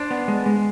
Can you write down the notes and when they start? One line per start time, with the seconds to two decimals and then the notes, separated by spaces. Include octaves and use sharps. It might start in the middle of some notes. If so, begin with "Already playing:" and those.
Already playing: D4 C5
0.11 B3
0.28 G#3
0.46 G#3